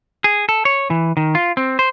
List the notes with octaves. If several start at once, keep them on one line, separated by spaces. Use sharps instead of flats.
G#4
A4
C#5
E3
D#3
F4
C4
C5